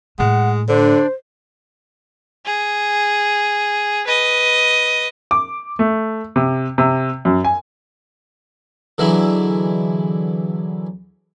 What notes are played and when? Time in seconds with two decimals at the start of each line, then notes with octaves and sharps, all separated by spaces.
0.19 A2 G#3 A3 F#5
0.68 D3 D4 C5
2.45 G#4
4.07 B4 D#5
5.31 D6
5.79 A3
6.36 C3
6.78 C3
7.25 F#2
7.44 G#5
8.98 D3 E3 F#3 G#3 E4